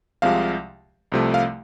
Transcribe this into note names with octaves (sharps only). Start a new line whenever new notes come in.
C2 C3 F3 G#3 F5
C2 C3 F3 A3
F5